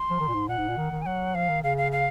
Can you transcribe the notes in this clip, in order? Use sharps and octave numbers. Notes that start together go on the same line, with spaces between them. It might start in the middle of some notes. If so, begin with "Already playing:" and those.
Already playing: C6
F3
D#3
A#2
G#2
A#2 F#5
G#2
A#2
D#3
D#3
G#5
F#3 F#5
F3 F5
D#3
C#3 F5
F5
F5